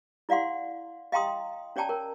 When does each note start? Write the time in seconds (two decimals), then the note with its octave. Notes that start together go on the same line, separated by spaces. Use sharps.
0.29 E4 D5 F5 F#5 C6
1.12 D#5 F5 G5 A#5 C6 D#6
1.76 C#4 C#5 D5 G5 A5 A#5
1.89 A#4 C#5